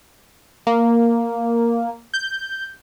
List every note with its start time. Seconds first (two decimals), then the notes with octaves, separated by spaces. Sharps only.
0.67 A#3
2.14 G6